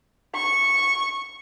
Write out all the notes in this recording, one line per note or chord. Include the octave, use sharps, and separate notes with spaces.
C#6